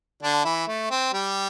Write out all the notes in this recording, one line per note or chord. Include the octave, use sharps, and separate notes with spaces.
D3 D4
E3 E4
A3
C4
G3 G4